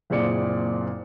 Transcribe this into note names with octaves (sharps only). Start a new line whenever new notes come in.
F#1 A#2 C4 G#4 D5 C#7